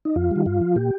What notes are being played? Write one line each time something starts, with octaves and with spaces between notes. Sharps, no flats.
D#4
F2 F4
D#3 G3
G2 F4
F3
A#2 G4